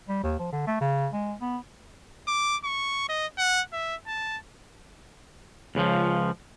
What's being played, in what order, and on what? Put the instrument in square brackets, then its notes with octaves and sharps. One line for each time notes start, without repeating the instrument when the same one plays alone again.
[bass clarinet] G3
D#2
F3
D3
A3
C#3
G#3
B3
[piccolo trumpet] D6
C#6
D#5
F#5
E5
A5
[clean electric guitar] C#2 C#3 E3 F3